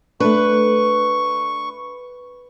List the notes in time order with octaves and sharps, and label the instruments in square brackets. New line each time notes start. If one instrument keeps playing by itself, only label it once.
[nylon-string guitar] A3 D4 [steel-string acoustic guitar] B4 [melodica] C#6